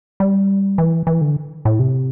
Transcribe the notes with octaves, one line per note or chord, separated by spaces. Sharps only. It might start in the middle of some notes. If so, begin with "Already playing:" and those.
G3
E3
E3
D3
A2
C3